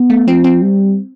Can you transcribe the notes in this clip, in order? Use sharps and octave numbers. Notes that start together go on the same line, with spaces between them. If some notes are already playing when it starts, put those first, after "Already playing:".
Already playing: B3
A3
F3 C4
C4
G3